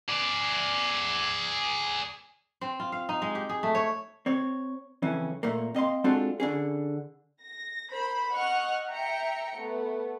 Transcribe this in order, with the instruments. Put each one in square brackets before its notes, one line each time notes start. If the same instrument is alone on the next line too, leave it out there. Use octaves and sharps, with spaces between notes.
[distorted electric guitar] G#4 D5
[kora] C4
F4
F5
D#4
G#3
G4
G#4
A3
C#5
[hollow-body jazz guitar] C4 C#5
F2 C#3 E3 C#4
A#2 A3 A#3
C4 D#5 F5 C6
G#3 C4 D4 F4 F#4 A4
D3 C#4 G#4
[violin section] A#6
A#4 C5 B5
D#5 F#5 C#6 F6 F#6
E5 G5 A#5 C#7
A3 B3